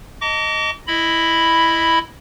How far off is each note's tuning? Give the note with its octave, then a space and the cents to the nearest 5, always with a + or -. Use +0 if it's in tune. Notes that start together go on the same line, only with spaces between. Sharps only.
D#5 +0 A5 +45 D6 -40
E4 +0 D#5 +0 B5 +0